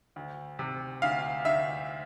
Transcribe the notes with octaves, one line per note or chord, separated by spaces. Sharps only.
D2
C3
D2 F5
D2 E5